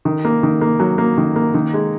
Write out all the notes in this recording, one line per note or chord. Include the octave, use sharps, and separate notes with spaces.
D#3
A#3
D#3
A#3
F#3
A#3
D#3
A#3
D#3
G#3